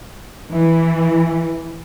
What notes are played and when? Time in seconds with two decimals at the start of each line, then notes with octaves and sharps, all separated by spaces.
0.50 E3